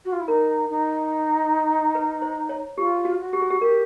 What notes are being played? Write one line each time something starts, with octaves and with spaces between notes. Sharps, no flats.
F#4
F4
E4
D#4 A#4
D#4
B4
C5
C#5
F4 G4
F#4
F#4
G4
G#4
G4
G4 A#4